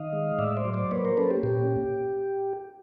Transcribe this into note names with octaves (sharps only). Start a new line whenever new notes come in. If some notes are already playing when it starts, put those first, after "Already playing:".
Already playing: D#3 D#5 F5
G#3
A2 D5 E5
C5 D5
F#3
C5 D5
A#3 B4 C#5
A#4 C5
C#4 A4 B4
G4
A#2 G4